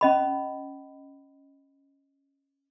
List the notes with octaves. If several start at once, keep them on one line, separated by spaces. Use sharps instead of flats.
C#4 D#5 B5